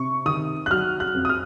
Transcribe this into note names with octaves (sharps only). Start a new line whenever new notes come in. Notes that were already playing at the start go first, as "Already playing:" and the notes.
Already playing: C3 C#6
D#3 D#6
F#6
F#3 F6
F#6
F2
D#6
F6